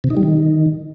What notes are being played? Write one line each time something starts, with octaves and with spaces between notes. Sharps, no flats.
C3
D#4
G3
D#3